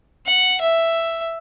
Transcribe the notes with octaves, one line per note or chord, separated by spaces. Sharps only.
F#5
E5